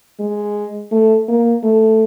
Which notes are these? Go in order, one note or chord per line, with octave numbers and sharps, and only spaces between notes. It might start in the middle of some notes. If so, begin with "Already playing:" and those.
G#3
A3
A#3
A3